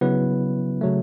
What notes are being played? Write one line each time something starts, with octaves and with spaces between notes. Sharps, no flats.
C#3 F#3 B3 E4 B4
C#3 F#3 A3